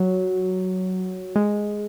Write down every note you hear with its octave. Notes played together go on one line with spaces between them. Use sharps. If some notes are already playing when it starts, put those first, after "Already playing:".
Already playing: F#3
G#3